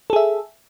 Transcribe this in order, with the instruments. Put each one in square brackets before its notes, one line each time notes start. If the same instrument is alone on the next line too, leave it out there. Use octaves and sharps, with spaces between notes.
[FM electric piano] A4
G#4
E5